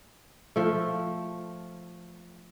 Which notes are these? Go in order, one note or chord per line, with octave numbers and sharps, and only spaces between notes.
F3 A3